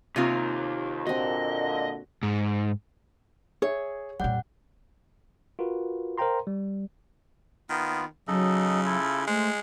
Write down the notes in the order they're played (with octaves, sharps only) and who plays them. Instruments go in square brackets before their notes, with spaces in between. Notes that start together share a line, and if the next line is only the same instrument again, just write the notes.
[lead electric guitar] D#2 [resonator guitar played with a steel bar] C3 A#3 [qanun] F4 G#5
[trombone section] A#2 D3 [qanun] C4 F#4 [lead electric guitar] D#5
[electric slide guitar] G#2
[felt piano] G#4 E5 [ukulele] C#5
[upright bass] F2 A#2 [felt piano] G3 G6 [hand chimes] F#5
[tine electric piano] F4 F#4 A#4 B4
A#4 C5 F5 G5 A#5 C6
G3
[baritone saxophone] D#3 [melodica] B3 F4
[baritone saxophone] C#3 [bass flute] F#3 [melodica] D#4 A4 D#5
[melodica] E4 F4 A4
[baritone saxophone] G#3 [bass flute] A3 [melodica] C5